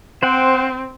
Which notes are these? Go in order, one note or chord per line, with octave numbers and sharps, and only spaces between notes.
C4 C5 F#5 G5